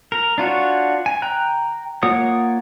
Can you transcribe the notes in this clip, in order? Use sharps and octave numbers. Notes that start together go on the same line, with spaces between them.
A#4
D4 F4 F#4 C#5
G#5
G5 A#5 F#6
A#3 F4 C#5 F#5 D#6